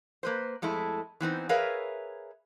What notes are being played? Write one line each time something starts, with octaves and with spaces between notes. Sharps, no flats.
A#3 B4 C5
F2 G#3 A3 E4
E3 B3 C4 D#4
G#4 A#4 B4 C#5 E5 F5